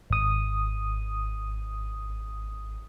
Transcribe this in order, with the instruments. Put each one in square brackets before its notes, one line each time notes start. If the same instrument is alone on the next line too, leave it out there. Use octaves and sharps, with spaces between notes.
[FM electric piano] G#1 D#6